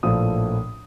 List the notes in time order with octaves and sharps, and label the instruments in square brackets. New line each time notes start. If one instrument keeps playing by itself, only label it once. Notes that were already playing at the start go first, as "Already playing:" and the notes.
[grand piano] A#1 A2 F3 A3 D#6